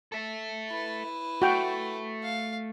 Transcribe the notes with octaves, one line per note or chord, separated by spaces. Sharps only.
A4 E5
E4 B4
A3 F#4 G5
F5